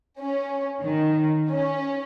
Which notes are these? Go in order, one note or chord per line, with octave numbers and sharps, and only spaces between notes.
C#4
D#3
C#4